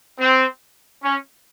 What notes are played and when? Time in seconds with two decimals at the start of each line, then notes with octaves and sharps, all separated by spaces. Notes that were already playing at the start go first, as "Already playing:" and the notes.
0.18 C4
1.02 C#4